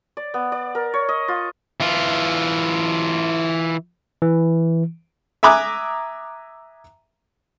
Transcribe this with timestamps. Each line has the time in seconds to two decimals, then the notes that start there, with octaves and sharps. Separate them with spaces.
0.17 D5
0.34 B3
0.52 D5
0.75 A#4
0.94 C#5
1.09 D#5
1.28 F4
1.80 E3 F4
4.22 E3
5.43 E5 G#5 A#5 D6 D#6 F#6